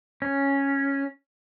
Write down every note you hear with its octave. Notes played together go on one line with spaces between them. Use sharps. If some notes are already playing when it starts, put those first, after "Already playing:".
C#4